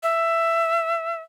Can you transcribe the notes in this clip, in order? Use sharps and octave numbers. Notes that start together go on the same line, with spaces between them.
E5